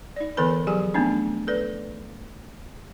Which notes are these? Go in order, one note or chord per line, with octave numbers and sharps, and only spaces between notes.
D#4 D5
D3 E3 B3 A4 B4 B5
F3 F#3 G4 G#4 G#5
A3 B3 C4 D4 D#4
A4 B4 D5